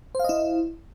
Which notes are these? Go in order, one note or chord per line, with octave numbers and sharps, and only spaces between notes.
E4 C5 D#5 F5